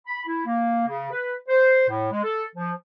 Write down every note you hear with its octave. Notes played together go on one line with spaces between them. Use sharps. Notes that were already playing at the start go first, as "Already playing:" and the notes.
B5
E4
A#3
C#3
B4
C5
A2
G#3
A4
F3